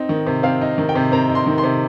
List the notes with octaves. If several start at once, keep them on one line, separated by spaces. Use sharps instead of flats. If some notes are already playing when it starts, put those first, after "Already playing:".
Already playing: C4 D#4
D#3
C3
C4 F5
D#4
D#3
G5
C3
C4 A#5
D#4
C6
D#3
C6
C3